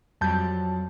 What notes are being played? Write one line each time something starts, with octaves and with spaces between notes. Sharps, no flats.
F2 F#3 G3 A5 G6